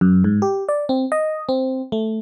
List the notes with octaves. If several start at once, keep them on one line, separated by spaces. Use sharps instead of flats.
F#2
G#2
G4
D5
C4
D#5
C4
A3